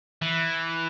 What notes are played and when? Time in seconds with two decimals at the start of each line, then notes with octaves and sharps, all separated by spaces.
0.22 E3